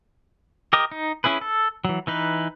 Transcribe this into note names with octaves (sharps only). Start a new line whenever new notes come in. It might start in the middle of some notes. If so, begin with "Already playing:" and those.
G4 A#4 D#5
D#4
C#4 E4 G#4 B4
A4
E3 F#3
E3 D#4 B4